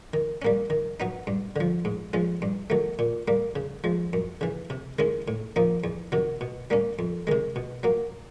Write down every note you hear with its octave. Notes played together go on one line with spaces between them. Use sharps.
D#3
G3 A#3 C#4
D#3
F#3 B3 D#4
G2
D3 F3
G#2
F3 G#3 C#4
G2
D#3 F#3 A3
A#2
G3 A#3
C#3
F3 G#3
F#2
C#3 E3
C3
D#3 G#3 C#4 E4
A2
F3 A#3 D#4
E2
C3 D#3 F#3
B2
G3 A#3 C#4
F2
C3 D#3 G#3
B2
F#3 A#3